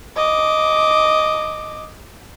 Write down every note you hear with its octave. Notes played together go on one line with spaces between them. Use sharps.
D#5 D6